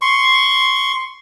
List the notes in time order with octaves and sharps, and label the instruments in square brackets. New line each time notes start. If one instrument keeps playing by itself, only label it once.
[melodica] C6 C#6